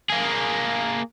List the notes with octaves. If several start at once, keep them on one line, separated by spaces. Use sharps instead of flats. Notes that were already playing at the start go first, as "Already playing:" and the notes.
A#3 G#4